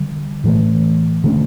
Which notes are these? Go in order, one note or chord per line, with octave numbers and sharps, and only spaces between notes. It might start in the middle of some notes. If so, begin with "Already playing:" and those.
Already playing: D3 G3
A2 E3 A3
D3 A3 C#4